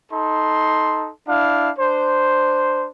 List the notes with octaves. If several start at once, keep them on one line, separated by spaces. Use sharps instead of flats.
D#4 A4 C6
D4 E4 F5
D4 C5